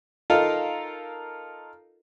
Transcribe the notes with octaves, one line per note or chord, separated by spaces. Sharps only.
D#4 F4 A4 A#4 F5